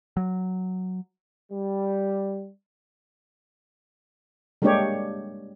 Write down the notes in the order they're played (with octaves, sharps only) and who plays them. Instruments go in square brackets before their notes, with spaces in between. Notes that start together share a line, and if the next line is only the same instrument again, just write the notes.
[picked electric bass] F#3
[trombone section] G3
[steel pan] G3 G#3 A#3 D4 G4 C#5